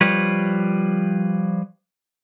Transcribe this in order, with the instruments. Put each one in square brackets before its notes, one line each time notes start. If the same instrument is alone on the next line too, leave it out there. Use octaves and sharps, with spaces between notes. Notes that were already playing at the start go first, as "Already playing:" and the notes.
[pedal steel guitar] F3 G3 B4 C#5